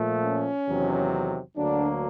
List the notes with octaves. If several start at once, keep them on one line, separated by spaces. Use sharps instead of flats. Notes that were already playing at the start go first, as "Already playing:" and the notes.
Already playing: A#2 F3 A3
C#4
E2 C3 D#3 F#3
D2 D3 F#3 A#3 D4